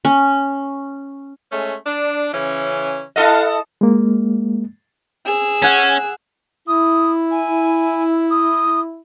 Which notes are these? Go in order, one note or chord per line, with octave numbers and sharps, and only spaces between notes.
C#4
G#3 A3 C#4
D4
C#3 E3 C#4
E4 A4 D#5 F5 F#5
G#3 A#3
G#4 E6
C#4 F#5 G#5
E4 D#6
G#5
D#6